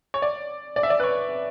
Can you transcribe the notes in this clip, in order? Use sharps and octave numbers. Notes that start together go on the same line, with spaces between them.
C#5
D5
D5
E5
D5
B4
C#5